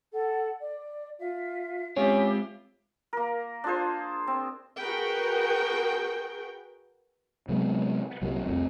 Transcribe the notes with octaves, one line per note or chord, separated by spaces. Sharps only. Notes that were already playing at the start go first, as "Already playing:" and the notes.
A4 F#5
D5
F4 E5
G#3 C4 C#4 F4 G4 B4 E5
A#3 A#4
D4 F4 G#4 C5
C4
F#4 G#4 A#4 B4 G5
C3 F#3 G#3 B3
C2 A#2 F#3 G3
F1 C2 F2